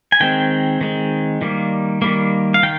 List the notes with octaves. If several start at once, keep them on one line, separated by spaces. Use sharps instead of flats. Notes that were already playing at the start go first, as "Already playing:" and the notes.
G#5
D#3 G#3 C4 G5
D#3 G#3 C4
D#3 G3 A#3
D#3 G3 A#3
F5
D#3 G5